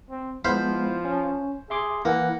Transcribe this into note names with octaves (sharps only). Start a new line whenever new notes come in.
C4
F3 G#3 B3 E4 C5 F5 B5
C#4
G#4 E5 C6 D6
E3 A#3 F#5